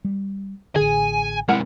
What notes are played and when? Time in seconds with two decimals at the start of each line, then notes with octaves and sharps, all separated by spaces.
0.05 G3
0.76 A1 D3 G#4 G#5
1.49 C3 G#3 E4 A#4 F#5